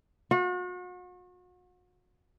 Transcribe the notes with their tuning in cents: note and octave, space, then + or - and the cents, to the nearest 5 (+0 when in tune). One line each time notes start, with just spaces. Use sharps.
F#4 -40